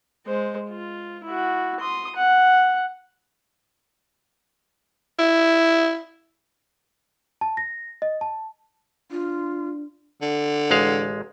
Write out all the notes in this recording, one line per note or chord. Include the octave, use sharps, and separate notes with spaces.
G#3 C5
F4
E4 F#4
C6 D#6
F#5
E4
A5
A#6
D#5
A5
D4 F4
D3
A1 G#3 F5